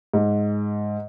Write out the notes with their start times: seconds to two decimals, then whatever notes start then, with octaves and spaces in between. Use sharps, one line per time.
0.14 G#2